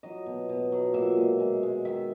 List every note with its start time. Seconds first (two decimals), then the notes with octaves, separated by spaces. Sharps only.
0.03 F#3 D#5
0.26 B2
0.49 B2
0.72 F#3
0.94 A#2 E5
1.17 G#3
1.40 G#3
1.63 G#3
1.85 D#3 E5